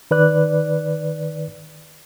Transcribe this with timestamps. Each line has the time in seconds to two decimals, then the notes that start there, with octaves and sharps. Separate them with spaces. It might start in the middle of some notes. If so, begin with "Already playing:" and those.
0.11 D#3 B4 D5 F#6